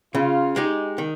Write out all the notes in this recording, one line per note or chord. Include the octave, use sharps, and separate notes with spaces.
C#3 F4
G#3 D#4 G4
D#3